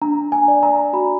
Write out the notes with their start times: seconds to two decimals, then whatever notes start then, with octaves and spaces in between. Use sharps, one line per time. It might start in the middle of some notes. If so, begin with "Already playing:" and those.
0.02 D4 A#5
0.32 G#5
0.48 D5
0.63 A#5
0.93 F#4 B5